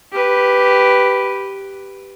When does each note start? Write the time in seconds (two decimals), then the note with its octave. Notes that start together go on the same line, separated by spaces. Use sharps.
0.12 G4 B4